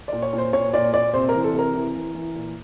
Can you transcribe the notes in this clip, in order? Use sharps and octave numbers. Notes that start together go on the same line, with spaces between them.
A#2 D5
C#5
A#2
C5
A#2 C#5
A#2 D5
A#2 D5
C3 C5
A#4
E3
A4
C3 A#4
E3
E3
E3
A#2